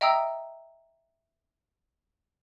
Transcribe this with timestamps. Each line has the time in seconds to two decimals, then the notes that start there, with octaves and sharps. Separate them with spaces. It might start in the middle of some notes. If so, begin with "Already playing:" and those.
0.01 D#5 E5 G5 A#5 D#6 E6